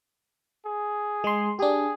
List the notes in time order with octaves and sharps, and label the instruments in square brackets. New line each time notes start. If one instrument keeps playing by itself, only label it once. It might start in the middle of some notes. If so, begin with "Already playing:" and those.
[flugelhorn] G#4
[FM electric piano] G#3 C6
[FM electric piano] D4 G4 [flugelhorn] G#4